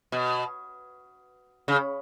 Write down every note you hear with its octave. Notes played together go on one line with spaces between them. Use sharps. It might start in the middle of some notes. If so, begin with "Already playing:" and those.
B2
C#3